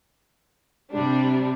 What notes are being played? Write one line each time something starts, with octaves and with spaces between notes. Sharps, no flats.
C3 G3 D4